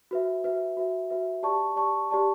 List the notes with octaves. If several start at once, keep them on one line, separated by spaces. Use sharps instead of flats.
F#4 B4 E5
F#4 B4 E5
F#4 B4 E5
F#4 B4 E5
G4 D5 A5 C#6
G4 D5 A5 C#6
G4 D5 A5 C#6